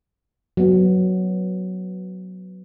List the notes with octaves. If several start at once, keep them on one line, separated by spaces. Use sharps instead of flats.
F#3 B3